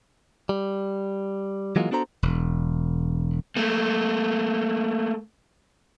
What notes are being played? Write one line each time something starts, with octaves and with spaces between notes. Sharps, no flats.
G3
E3 F#3 G#3 A#3 F4
B3 D4 F#4 A4 C5 A#5
E1
A3 A#3